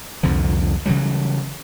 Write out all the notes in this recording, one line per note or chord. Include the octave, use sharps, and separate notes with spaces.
C2 F2 D3 F3
C#3 E3 F#3 G3